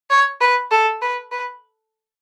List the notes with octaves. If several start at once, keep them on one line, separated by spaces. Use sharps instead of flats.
C#5
B4
A4
B4
B4